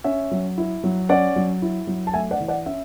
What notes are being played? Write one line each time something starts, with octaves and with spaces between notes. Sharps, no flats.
C#4 E5
F#3
E4
F#3
C#4 D5 F#5
F#3
E4
F#3
A5
A3 E5 G#5
D5 F#5
E3
D5 F#5
C#4 E5